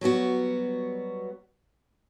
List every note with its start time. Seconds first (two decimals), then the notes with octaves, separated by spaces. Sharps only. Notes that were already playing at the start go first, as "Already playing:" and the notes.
0.01 F#3 G3 B3 F#4